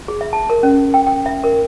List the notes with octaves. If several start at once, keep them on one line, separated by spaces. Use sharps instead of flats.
G#4
E5
A5
A#4
C#4
G5
G5
E5
A#4